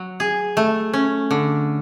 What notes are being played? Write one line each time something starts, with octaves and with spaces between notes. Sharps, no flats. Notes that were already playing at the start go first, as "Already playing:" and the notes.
Already playing: F#3
G#4
A3
C#4
D3